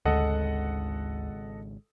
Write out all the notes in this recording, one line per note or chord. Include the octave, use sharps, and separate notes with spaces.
G#1 D2 C#3 G#3 A4 D#5 F#5